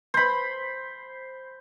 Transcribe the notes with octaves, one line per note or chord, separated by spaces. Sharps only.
C5 B5